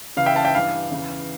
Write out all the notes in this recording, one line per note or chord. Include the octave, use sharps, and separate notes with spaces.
C#2 C#3 E3 F5
E5 G5
F5 A5
E5 G5
G2 E3 F5
E2 C#3 E3